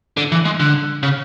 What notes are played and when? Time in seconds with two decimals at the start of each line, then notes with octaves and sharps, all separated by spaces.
0.17 D3
0.32 E3
0.45 G#3
0.60 D3
1.03 C#3